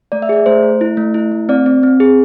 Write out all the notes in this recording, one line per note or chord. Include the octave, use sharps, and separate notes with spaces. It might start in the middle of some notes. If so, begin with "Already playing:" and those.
A3 D5
E5
G#4 D5
A3 C5
A3
E4
A3
E4
A3
C4 D5
C4
C4
G#4